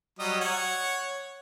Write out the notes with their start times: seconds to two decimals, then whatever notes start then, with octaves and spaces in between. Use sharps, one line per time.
0.19 F#3 G3 D#5
0.41 C#5 F#5